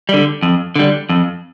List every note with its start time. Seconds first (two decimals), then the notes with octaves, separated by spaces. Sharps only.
0.09 D3 G3
0.42 F2
0.76 D3 G3
1.09 F2